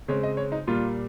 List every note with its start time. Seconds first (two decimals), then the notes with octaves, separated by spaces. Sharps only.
0.08 C#3 G#3 C4 C#5
0.23 D#5
0.37 C#5
0.52 D#4
0.67 A#2 G3 A#3 F4